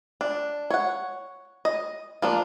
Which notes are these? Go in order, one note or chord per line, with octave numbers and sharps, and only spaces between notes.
D4
C#5 F#5
D#5
F3 A#3 D4